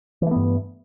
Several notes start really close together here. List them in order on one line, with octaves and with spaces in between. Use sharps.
E3 A3 B3 G2